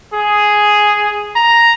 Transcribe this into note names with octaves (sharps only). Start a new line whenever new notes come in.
G#4
A#5